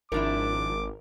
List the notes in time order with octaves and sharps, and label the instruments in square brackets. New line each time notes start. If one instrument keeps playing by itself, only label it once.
[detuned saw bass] G#1 [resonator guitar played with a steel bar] F3 D4 E4 [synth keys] A#4 [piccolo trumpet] D6